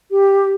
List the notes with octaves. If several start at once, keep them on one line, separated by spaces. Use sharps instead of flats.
G4